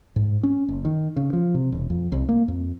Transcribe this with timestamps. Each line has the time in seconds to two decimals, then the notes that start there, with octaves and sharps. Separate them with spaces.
0.16 G#2
0.43 C#4
0.68 F#1
0.85 D#3
1.16 C#3
1.33 F3
1.54 C3
1.72 E1
1.90 F2
2.12 C2
2.29 A#3
2.48 F2